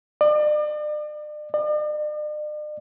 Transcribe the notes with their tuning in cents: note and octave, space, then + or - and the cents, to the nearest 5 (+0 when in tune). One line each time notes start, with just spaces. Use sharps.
D5 +40
D5 +45